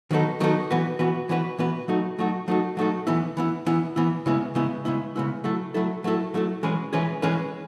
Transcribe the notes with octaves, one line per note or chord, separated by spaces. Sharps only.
D#3 F#3 B3 D#4 A4
D#3 F#3 B3 D#4 A4
E3 B3 F#4 B4
E3 B3 F#4 B4
E3 B3 F#4 B4
E3 B3 F#4 B4
F#3 A3 D#4 F#4 A4
F#3 A3 D#4 F#4 A4
F#3 A3 D#4 F#4 A4
F#3 A3 D#4 F#4 A4
E3 B3 E4
E3 B3 E4
E3 B3 E4
E3 B3 E4
C#3 G#3 B3 E4
C#3 G#3 B3 E4
C#3 G#3 B3 E4
C#3 G#3 B3 E4
F#3 A3 E4 A4
F#3 A3 E4 A4
F#3 A3 E4 A4
F#3 A3 E4 A4
E3 G#3 C#4 G#4 B4
E3 G#3 C#4 G#4 B4
E3 G#3 C#4 G#4 B4